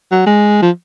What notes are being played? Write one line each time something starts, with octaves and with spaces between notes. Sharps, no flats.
F#3
G#3
F3